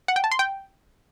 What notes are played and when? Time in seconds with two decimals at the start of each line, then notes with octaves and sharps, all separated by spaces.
0.08 F#5
0.16 G5
0.24 A5
0.31 C6
0.39 G5